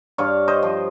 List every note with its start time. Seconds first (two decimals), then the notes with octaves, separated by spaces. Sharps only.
0.18 G2 C#5 F5
0.48 C5 D#5
0.63 F3